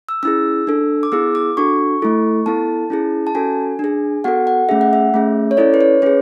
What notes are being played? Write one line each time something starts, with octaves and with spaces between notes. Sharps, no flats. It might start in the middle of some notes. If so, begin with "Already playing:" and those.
E6
C#4 E4 G#4 E6
D4 A4
D6
B3 E4 G#4 E6
D6
D4 F#4 A4 C#6
A3 E4 A4
B3 E4 A4 A5
C#4 E4 G#4
A5
C#4 F#4 A4 G#5
D4 G#4
B3 F#4 A4 F#5
F#5
A3 C#4 G#4 E5
F#5
E5
A3 C#4 G#4
C#5
C#4 E4 A4 D5
B4
C#5
C#4 G#4 B4